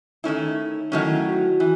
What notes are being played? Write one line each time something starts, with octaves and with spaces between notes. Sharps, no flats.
D#3 A3 C#4 D#4 E4
D#3 F#3 A3 C#4 E4
F#4
E3